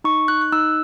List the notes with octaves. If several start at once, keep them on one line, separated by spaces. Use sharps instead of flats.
D#4 C#6
D#4 F#6
F#6
D#4 E6